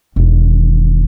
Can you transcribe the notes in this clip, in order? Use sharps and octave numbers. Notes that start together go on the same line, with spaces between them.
E1 D#3